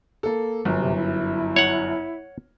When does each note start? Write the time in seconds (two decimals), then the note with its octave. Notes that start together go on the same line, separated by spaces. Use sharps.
0.23 A#3 A4
0.65 G1 F#2
0.81 C3
0.95 E4
1.56 C#5 F#5